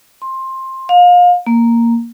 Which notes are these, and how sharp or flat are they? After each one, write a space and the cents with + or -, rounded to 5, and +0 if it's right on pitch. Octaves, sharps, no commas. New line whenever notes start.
C6 +15
F5 +30
A#3 -5